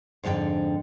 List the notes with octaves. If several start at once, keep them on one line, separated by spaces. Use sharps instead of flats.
F2 G#2 D3 A4 G5